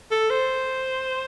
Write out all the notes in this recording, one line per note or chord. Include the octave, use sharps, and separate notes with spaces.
A4
C5